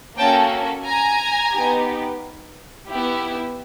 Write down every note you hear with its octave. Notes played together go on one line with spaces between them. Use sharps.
A#3 C#4 F#4 A4 G5 A5
G#5 A#5
B3 D#4 G4
B3 E4 G4